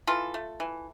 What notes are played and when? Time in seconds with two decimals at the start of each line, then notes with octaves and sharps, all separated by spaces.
0.07 E3 F4 A4
0.34 A3
0.60 E3